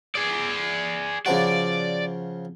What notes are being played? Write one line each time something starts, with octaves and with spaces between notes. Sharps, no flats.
G#4 D5
C#3 F3 F#4 D5